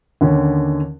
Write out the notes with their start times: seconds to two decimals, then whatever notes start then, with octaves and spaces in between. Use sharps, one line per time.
0.21 D#2 D3 C#4